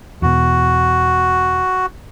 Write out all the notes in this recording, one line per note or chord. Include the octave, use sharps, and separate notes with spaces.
E2 B2 F#4